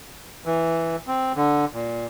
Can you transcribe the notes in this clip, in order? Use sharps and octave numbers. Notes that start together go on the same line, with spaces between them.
E3
C4
D3
A#2